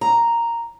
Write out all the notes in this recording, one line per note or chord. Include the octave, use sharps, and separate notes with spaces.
A#5